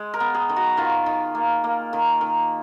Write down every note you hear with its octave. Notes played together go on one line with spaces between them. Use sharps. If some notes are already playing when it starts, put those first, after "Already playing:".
Already playing: G#3
A#4
B3
G#4
D#3
F#4
D#3 F4
D#3
A#3
A#3
D#3
D#3